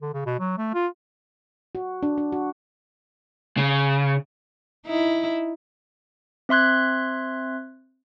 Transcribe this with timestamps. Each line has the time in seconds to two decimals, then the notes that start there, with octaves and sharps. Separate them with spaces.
0.02 D3
0.14 C#3
0.26 B2
0.40 F#3
0.58 A3
0.74 F4
1.75 F#4
2.03 D4
2.18 D4
2.32 F#4
3.57 C#3
4.86 D#4 E4
6.49 C4 E5 C6 F#6 G#6